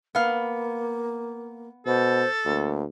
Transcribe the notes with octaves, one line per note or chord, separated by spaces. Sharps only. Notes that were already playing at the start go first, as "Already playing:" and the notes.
A#3 B3 F5
B2 A4 C5
D2 A#3